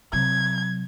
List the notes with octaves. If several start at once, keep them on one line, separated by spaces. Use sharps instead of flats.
C3 F#3 G#6